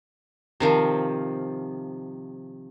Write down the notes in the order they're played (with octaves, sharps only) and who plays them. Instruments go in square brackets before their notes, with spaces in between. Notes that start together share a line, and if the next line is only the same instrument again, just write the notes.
[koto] C3 D#3 F3